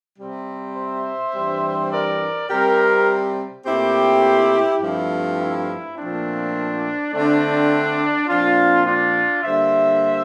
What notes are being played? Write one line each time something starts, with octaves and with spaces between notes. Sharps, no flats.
C3 G3 C4
C5 E5
G2 E3 G3 C4
A#4 D5
C3 G3 C4 G4 A#4
A#2 A3 C4 E4 G4
G2 F3 A3 C4 E4
E4
A#2 F3 A3 C4 D4
D3 A3 C4 D4
A#2 F3 C4 D4 F4
D4 F4
D3 G3 A#3 C5 E5